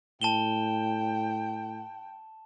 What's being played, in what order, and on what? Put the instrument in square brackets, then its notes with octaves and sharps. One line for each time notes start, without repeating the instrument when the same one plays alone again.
[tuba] A2 [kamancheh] G5 [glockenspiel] A5 E7 G7